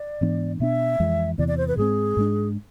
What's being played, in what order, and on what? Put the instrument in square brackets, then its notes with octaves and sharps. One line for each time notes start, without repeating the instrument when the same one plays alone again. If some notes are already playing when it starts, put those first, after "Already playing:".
Already playing: [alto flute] D5
[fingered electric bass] G#2 E3 B3 D4
[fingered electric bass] B2 B3 D4 [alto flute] E5
[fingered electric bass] F2 E3 G#3
[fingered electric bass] E2 C3 E3 B3 [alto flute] D5
[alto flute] D5
C5
B4
[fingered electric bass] G#2 G#3 C4 [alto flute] G#4
[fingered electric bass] G#2 G#3 D4